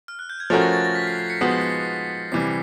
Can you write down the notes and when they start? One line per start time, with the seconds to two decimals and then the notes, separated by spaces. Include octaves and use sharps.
0.08 F6
0.19 F#6
0.30 G6
0.40 G#6
0.50 F3 A3 C#4 F#4 A#4 A6
0.62 A#6
0.73 A6
0.84 A#6
0.95 B6
1.07 C7
1.19 C7
1.30 C#7
1.41 F3 G#3 B3 D#4 F#4 C7
1.51 B6
1.61 C7
2.32 C3 E3 G3 C7